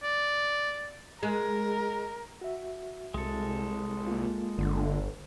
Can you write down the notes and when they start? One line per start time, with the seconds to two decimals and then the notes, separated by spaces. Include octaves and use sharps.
0.03 D5
1.23 G#3 A#4
2.41 F#4 E5
3.14 C2 G#3 A4
4.07 A#3 F4
4.58 G1 D3